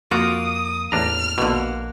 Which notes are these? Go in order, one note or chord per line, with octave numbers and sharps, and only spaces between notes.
F2 A#3 F4 F#4 D6 D#6
A1 E2 D4 A#5 F6
A#1 B2 D3 A#3 F#5